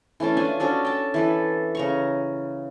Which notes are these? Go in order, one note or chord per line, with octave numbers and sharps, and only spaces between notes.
E3 A3 C#4 A5
D4 F4 G#5
C#4 D4 F#4 A4
G5 A5
E3 A4 B4
C#3 A#5 C#6